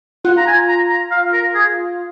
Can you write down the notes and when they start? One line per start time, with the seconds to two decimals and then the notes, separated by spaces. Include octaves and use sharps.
0.25 F4 F#5
0.37 A#5
0.47 G#5
0.68 A#5
0.90 A#5
1.11 F5
1.33 A#4
1.54 G#4